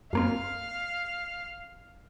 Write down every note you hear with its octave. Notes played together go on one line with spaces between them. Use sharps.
F#2 A#3 C4 F5